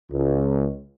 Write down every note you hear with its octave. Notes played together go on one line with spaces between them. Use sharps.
C#2